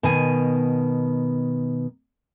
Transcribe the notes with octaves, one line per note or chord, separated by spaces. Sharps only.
B2 D#3 G#5